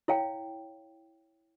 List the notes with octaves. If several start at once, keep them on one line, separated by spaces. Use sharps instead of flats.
E4 C#5 F5 G5